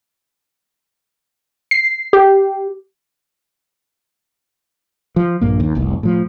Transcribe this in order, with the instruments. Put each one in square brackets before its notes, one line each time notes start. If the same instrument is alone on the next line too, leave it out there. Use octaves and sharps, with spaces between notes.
[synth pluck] C7
G4
[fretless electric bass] F3
A#1 G2 A#3
D#2
F1 C2
A2 F3